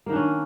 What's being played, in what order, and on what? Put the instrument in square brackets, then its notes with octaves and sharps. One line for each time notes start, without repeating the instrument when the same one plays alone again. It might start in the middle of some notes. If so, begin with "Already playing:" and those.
[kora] A#3
D#3
D4
C#4